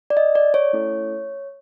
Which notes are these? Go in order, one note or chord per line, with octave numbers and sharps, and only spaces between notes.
D5
D#5
D5
C#5
A3 C#4 E4 A4